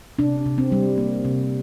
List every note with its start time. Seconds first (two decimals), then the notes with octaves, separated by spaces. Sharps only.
0.19 C3 D4
0.46 C3
0.58 C4
0.72 G3
0.98 A#3
1.25 C3